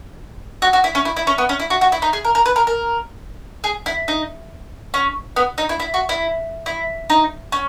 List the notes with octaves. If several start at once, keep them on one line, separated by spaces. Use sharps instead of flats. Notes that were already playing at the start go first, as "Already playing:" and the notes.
F#4
F#4
E4
C#4
E4
E4
C#4
B3
C#4
E4
F#4
F#4
E4
D#4
G#4
A#4
A#4
B4
A#4
A#4
G#4
E4
D#4
C#4
B3
D#4
E4
E4
F#4
E4
E4
D#4
C#4